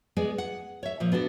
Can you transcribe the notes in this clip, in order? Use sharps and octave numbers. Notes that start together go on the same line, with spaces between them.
G#3 B3 G#4 D5
F#5
C#5 E5
A#2 F3
B3 D4 F#4 A4